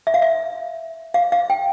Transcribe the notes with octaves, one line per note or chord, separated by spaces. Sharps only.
E5
F5
E5
F5
F5
G5